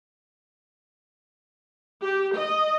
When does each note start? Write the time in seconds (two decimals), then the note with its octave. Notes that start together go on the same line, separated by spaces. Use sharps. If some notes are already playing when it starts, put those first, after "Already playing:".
2.03 G4
2.36 D#5